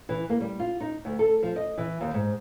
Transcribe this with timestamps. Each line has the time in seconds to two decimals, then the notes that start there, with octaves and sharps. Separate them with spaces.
0.09 E3
0.29 A#3
0.41 G3
0.59 F4
0.80 D#4
1.05 D2
1.19 A4
1.42 F3
1.56 D#5
1.78 E3
2.01 D#2
2.14 G#2